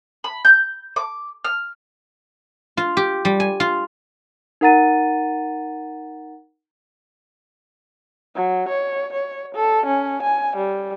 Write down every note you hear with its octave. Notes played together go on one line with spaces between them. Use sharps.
B5
G6
D6
F6
F4
G4
G3
G#5
F4
D#4 A#4 F#5 A#5 A6 D#7
F#3
C#5
C#5
A4
C#4
G#5
G3